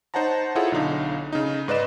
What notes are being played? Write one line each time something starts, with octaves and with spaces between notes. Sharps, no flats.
D#4 C5 C#5 F#5 A5 A#5
E4 F4 G#4 A4 C#5 F#5
B1 D3 D#4 F5
C#3 D#4
G#2 B4 D5 D#5 E7